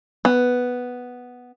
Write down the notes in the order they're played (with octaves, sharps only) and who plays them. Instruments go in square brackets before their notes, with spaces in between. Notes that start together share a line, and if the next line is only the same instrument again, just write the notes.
[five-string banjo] B3